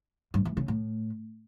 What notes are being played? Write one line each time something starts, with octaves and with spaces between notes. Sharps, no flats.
G2
E3
C#3
A2